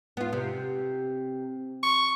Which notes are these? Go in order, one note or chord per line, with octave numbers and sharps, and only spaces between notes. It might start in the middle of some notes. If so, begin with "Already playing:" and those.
B3 F4
C3
C#6